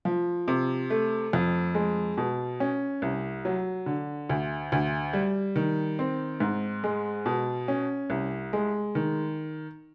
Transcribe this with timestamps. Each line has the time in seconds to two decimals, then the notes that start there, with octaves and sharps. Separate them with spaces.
0.05 F3
0.48 C3
0.90 A3
1.33 F2
1.75 G#3
2.17 B2
2.60 C#4
3.02 C2
3.45 F#3
3.86 D3
4.29 D2
4.72 D2
5.13 G3
5.56 D#3
5.99 C4
6.40 G#2
6.84 G#3
7.26 B2
7.68 C#4
8.10 C2
8.53 G#3
8.95 D#3